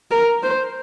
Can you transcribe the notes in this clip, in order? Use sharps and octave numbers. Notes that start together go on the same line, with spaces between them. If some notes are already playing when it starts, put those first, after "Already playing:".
A#4
C5